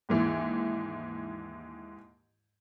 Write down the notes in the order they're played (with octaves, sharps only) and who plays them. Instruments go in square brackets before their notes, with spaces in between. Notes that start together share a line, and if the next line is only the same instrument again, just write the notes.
[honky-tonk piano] D#2 G#2 E3